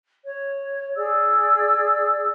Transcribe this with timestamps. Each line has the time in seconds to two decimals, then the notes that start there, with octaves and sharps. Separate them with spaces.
0.24 C#5
0.95 G#4 D5 E6